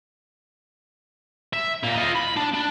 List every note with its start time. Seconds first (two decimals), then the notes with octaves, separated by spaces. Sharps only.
1.53 E5
1.84 A#2 A#3
1.96 F4 D#5
2.16 B5
2.37 D4
2.54 D4